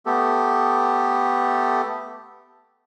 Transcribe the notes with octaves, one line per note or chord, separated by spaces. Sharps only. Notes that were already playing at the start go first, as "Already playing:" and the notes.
A3 B3 G4 A4